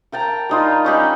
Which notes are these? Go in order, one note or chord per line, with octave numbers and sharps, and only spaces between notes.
A#4 G5 A5 A#5
G3 D#4 F4
C#4 D#4 G4 B5